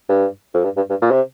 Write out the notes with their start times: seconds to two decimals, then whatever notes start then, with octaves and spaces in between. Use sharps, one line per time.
0.09 G2
0.54 F2
0.64 G2
0.77 G2
0.89 G2
1.02 A#2
1.11 C3